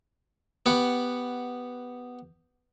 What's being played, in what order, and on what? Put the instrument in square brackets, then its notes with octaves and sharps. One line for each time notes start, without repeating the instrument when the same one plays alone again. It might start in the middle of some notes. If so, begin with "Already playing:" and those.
[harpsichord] B3 G4 F#5